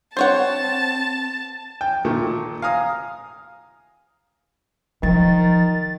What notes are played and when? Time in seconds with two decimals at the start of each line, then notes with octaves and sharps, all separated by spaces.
0.17 C4 C5 C#5 F#5 A5
1.81 G5
2.05 A#2 D#3 A3
2.62 F5 G#5 A#5 D#6
5.03 D#3 F3 A6